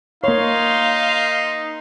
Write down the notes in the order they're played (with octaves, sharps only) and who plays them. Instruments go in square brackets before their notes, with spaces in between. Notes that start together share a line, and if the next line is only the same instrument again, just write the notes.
[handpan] A#3 C#5 [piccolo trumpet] D#4 [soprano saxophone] F5 [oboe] C6